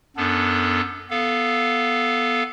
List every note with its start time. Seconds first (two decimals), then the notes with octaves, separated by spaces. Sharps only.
0.17 F#2 B3 D4 A4
1.10 B3 A4 F5